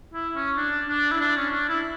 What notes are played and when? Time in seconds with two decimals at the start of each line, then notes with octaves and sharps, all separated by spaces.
0.14 E4
0.36 C#4
0.57 D4
0.89 D4
1.12 E4
1.21 D4
1.37 C#4
1.53 D4
1.69 E4